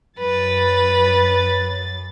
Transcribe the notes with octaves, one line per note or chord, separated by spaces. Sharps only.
F#2 B4 A6